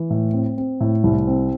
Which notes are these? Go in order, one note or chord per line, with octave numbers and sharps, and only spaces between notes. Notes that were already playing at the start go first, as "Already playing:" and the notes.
Already playing: E3
A2
C4
C4
A2
C2
C4